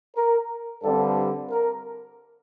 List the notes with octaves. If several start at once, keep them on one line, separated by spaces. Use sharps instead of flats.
A#4
G2 D3 G3 C4 A4
A#4